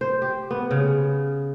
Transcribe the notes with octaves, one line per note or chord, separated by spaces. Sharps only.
C5
G4
B3
C#3